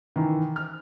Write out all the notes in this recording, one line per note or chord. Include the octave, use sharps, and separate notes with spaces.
D#3 E3
F6